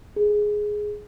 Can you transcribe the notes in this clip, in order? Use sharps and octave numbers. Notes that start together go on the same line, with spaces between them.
G#4